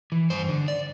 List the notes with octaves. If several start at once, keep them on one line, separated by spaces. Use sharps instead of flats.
E3
G2 C5
D3
D5